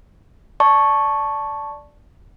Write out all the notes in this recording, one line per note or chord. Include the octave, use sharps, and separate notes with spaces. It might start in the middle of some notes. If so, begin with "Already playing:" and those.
D5 A5 C#6